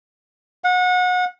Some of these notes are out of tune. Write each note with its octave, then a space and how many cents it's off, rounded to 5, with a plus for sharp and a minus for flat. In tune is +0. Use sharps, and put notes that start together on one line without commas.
F#5 -30